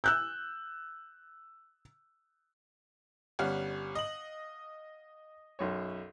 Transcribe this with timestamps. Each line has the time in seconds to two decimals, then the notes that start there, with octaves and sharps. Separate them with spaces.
0.04 E6 F#6 G6
3.39 G1 G3 C#4 F5 F#5
3.95 D#5 F#7
5.59 B1 F#2 C#5